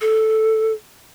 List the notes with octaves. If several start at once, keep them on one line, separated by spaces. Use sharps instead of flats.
A4